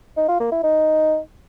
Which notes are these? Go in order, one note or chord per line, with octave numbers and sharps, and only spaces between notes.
D#4
F4
A#3
E4
D#4